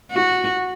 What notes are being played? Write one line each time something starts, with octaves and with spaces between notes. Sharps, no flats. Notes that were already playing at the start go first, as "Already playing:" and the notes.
F#4